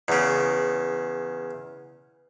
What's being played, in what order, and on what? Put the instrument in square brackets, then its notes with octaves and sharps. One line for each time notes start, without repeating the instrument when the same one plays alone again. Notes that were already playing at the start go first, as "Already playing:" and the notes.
[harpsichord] E2 C#3